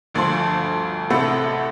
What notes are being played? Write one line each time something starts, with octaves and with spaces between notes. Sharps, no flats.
G1 D2 F3 A4 C6
A1 C3 A3 F#5 B5 E6